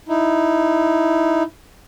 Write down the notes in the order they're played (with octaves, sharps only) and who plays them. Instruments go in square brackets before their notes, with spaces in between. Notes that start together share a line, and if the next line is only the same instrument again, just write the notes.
[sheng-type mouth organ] D#4 E4